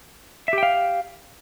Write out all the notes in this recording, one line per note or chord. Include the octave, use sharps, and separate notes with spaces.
G4 E5 F5 G5